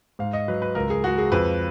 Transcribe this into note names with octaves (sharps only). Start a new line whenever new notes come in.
G#2 F5
D#5
F#3 B4
B4
C#2 A#4
G#4
G#3 F#4
G#4
F2 B4